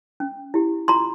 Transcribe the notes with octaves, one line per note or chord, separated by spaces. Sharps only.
C#4
E4 G4
F4 A#5 C6